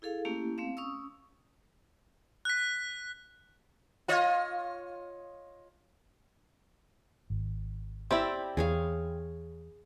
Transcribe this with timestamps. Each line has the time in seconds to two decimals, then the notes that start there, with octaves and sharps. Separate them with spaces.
0.02 E4 G#4 A4 F5
0.25 A3 A#3 C#4 E4 G4
0.58 A3 C4 F5
0.77 C#4 C#6 D#6 E6
2.45 F#6 B6
4.08 F4 C#5 D#5
7.30 G#1
8.11 C4 E4 G4 D5 B5
8.57 E2 G#4 C#5 F5